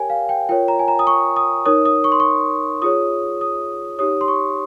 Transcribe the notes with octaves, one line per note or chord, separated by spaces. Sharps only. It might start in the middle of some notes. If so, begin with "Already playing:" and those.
Already playing: G4 A#4 C#5 G5 G#5
F5
G5
F4 A#4 C#5 G5
A#5
G#5
A#5
D#6
C#6
D#6
D#4 A#4 C#5 D#6
D#6
C#6
C6
C#6
F4 G#4 C#5 D#6
D#6
D#4 G4 C#5 D#6
C6
C#6